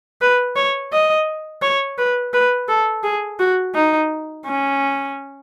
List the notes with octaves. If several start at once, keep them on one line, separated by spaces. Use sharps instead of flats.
B4
C#5
D#5
C#5
B4
B4
A4
G#4
F#4
D#4
C#4